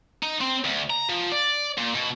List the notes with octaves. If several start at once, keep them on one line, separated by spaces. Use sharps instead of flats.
D#4
C4
D2
A#5
F3
D5
A#2
B2